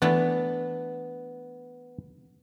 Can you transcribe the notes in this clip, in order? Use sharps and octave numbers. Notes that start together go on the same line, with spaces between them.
E3 A3 B3 D4